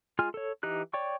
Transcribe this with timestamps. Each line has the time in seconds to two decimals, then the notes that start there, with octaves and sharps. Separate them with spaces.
0.19 G#3 F4 G#4 G#5 F6
0.34 A4 C#5
0.63 E3 D#4 G4 F#6
0.93 C#5 D5 G5 C#6